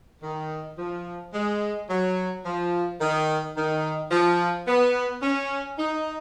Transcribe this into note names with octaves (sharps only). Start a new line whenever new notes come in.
D#3
F3
G#3
F#3
F3
D#3
D#3
F3
B3
C#4
D#4